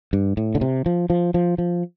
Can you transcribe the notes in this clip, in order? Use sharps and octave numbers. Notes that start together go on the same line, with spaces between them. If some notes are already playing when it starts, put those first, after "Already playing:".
G2
A2
D3
C3
F3
F3
F3
F3